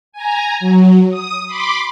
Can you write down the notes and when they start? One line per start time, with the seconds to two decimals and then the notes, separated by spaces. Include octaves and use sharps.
0.12 G#5 A#5
0.60 F#3
1.10 D#6
1.47 B5 C6 D6